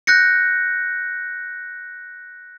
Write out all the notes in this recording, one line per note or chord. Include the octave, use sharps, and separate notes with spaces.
F#6 G6 A#6 C#7